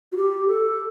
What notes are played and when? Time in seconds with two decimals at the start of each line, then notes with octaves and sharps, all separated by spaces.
0.12 F#4
0.17 G4
0.48 A4